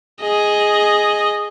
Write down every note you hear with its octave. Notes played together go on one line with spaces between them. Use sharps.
G#4 D#5